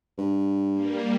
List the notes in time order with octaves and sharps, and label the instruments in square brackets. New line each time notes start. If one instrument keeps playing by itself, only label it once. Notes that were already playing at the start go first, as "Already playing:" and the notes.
[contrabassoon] G2
[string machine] G3 A#3